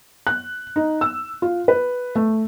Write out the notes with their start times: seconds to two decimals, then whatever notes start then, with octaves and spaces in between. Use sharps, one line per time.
0.27 F#6
0.76 D#4
1.01 E6
1.42 F4
1.68 B4
2.16 A3